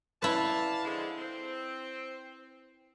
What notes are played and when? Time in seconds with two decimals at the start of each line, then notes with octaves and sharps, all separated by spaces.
0.22 E4 B4 D5 F5 A5
0.85 D3 F3 G#3
1.18 C4